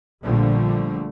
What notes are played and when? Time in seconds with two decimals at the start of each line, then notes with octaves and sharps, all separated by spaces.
0.23 A#1 A#2 D3 F3 G3 A3